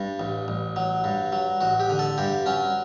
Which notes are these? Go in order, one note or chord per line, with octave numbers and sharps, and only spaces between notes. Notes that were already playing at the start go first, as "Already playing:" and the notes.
Already playing: G2 D4
A1
A1
F#3
G2
F#3
A1 F#4
G4
D3
A4
G2 G4
F#3 C#4